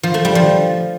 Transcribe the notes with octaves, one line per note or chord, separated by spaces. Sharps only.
F3
A3
G3
F3